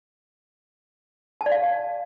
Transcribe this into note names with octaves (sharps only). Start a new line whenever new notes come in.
A5
D5
F5